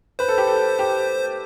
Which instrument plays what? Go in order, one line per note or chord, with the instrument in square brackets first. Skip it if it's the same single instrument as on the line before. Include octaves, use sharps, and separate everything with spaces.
[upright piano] B4 [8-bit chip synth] C5
[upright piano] A4
G4
A4
G4